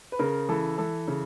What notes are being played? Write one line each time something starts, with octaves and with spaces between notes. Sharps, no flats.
B4
C#3 A#4
E3 A4
E3 A4
C#3